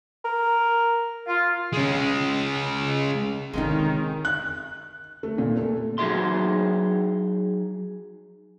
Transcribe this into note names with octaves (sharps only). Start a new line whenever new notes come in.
A#4
F4
G#3 C#4
D3 D#3 G#3 C4 C#4 D#4
F#6
A3
A#2
A3
F#3 D#4 F#4 G#4 E5 C6